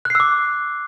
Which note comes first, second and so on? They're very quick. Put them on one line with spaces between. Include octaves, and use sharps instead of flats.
F#6 C7 E6 D6